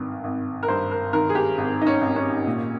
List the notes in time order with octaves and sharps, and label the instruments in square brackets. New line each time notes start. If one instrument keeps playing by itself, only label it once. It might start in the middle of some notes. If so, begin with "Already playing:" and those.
Already playing: [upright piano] G#1 G2 D#3
G#1
A#4
G2 C5
A#4
D#3 A#4
G#4
G4
G#1
D#4
C#4
G#1
C#4
A#2